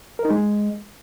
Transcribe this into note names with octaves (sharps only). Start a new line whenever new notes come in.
A#4
D#4
G#3